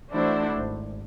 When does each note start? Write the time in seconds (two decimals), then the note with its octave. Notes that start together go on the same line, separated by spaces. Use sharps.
0.10 E3 A3 D4 E4 F#4 C5
0.53 G#1